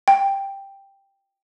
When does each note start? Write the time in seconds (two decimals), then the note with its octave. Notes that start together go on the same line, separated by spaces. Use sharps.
0.08 G5